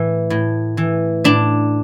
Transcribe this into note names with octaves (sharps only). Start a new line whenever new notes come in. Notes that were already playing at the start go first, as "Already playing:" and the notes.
Already playing: A2 E3
A2
E3
A2 D4